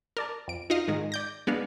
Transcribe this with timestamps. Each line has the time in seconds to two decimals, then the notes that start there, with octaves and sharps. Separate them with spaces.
0.17 A#4 D5 A5
0.48 F2 D7
0.70 D#4 F4 D#5 F5
0.88 G#2 D#3 G#3
1.12 D5 G6 A#6
1.47 G#3 B3 D4 F5